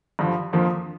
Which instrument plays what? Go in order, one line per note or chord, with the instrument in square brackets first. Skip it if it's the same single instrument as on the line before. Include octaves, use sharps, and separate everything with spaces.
[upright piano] G2 D3 F3
F2 D3 F3 A#3